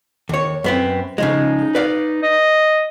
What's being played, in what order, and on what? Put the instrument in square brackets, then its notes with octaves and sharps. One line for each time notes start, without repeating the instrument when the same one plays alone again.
[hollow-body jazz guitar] D#2 C#5
F#2 B3 C4
[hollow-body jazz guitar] C#3 F3 G#3 [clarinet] D#4
[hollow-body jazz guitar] B4 D5 F5
[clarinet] D#5